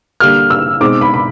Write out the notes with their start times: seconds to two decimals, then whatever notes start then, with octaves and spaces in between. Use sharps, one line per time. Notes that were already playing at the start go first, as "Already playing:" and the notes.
0.20 D3 G3 A#3 F6
0.50 E6
0.80 B2 G#3 C4 D#4 D6
1.01 B5
1.14 B5